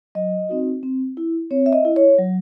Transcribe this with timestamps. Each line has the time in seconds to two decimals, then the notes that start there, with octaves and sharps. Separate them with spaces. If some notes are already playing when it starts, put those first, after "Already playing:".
0.15 F#3 D#5
0.49 C4 D#4 F#4
0.83 C4
1.17 E4
1.51 C4 C#5
1.66 E5
1.73 D#5
1.85 E4
1.96 C#5
2.18 F#3